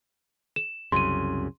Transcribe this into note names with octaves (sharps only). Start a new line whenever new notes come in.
E7
C2 F#2 C#3 C6 D#7